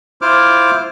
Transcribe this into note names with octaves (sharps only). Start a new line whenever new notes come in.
E4 F4 C5 D6 F6